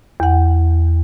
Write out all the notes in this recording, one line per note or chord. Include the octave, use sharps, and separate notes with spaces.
E2 F#5